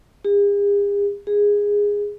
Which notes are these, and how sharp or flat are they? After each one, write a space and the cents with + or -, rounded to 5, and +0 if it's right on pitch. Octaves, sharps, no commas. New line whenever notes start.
G#4 -45
G#4 -15